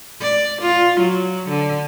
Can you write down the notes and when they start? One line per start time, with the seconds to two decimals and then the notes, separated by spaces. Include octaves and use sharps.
0.21 D5
0.62 F4
1.01 F#3
1.49 D3